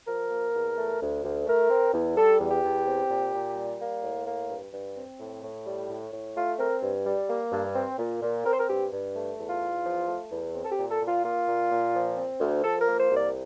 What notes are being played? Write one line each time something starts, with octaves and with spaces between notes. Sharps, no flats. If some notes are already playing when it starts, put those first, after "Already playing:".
F3 A#4
A#3
E2
A3
D2
D2
A3 A#4
C4
E2
G3 A4
E2
G4
E2
C4
A#2
A#2
G3
A#3
A2
A#3
G2
G2
C4
A2
A2
G3
A2
A2
A3 F4
C4 A#4
G2
G3
A#3
G2
C4
A#2
A#2
C4 A#4
C5
A#4
G2 G4
G2
A3
E2
F4
E2
F3
A3
E2
C4
A4
G4
A#2
A4
A#2
F4
A#3 F4
A#2
A#2
F3
C4
D2
F3 A4
A#4
A#3
C5
C2
D5